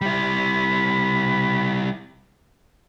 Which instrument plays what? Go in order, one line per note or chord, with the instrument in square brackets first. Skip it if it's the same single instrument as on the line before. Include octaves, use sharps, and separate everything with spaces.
[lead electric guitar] G3 E4 [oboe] B5